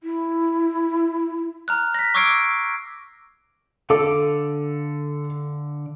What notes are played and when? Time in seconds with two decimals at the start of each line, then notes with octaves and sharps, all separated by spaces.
0.03 E4
1.68 A#5 F6 F#6
1.95 A#6 B6
2.14 C#6 D6 E6 G#6 C7 D7
3.90 D3 A4 F5 D6